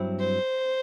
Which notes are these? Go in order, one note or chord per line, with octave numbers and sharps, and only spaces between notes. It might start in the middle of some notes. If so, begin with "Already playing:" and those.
Already playing: G2 F#3 C4 E4
C5